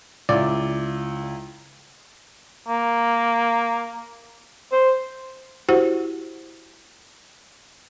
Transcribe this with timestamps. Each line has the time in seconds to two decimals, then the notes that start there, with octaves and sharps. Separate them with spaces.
0.29 C#2 E4 D5
2.67 A#3
4.72 C5
5.69 E4 F#4 G4 C5 F#5